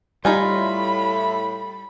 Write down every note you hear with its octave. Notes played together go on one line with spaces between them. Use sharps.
A2 G3 D#4 F4 G#5 B5